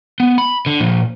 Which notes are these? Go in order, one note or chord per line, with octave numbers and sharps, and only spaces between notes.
B3
B5
D3
A#2 F3